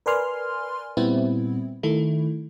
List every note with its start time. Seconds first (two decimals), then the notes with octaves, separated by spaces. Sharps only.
0.06 A#4 B4 D5 G#5 C6 F6
0.97 A#2 G3 B3 C4 E4
1.83 D#3 A3 E4